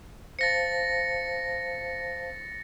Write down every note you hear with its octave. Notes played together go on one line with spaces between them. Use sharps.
C5 F5 A5 A6 A#6 C#7